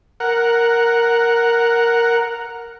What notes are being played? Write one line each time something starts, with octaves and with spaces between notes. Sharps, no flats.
A#4 F#5